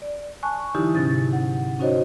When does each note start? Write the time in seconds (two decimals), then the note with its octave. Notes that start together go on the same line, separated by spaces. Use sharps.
0.02 D5
0.43 G#5 A5 C#6 F#6
0.75 D3 E3 F#3 D#4 E4 G4
0.94 G#2 C3 C#4 A6
1.33 F#5
1.79 C#4 D#4 F#4 C5 C#5 D#5